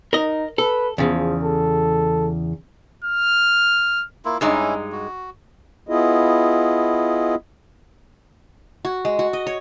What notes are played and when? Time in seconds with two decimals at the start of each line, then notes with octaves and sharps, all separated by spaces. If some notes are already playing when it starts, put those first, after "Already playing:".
0.13 D#4 A#4 D#5
0.58 A4 B4
0.98 E2 C#3 F3
1.43 A4
3.04 F6
4.25 A#3 E4 F4
4.41 G2 G#3 C#4 D#4 E4
4.92 F#4
5.89 B3 E4 F4 G#4 D#5
8.85 F#4
9.05 G#3
9.19 F#4
9.33 D#5
9.47 C#5